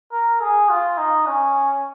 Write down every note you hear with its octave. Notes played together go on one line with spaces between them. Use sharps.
A#4
G#4
F4
D#4
C#4